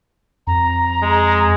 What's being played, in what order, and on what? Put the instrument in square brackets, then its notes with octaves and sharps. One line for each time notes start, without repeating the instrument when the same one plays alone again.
[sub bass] F2 [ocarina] A#5
[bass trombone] G#3